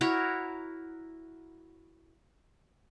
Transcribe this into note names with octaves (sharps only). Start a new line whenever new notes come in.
E4 F#4 A#4 C#5